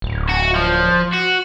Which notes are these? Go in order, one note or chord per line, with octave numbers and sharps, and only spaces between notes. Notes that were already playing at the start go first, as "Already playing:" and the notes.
D1
F#4
F3
F#4